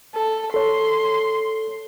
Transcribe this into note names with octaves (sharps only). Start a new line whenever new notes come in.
A4
A4 C#5 C6